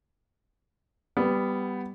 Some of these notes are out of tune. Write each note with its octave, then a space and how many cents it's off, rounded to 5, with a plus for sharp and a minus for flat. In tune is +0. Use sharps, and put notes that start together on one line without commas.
G3 +0 B3 +10